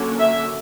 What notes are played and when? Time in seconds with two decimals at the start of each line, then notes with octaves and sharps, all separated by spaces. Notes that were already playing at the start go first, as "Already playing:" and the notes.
Already playing: D3 F#3 A#3 C#4
0.19 E5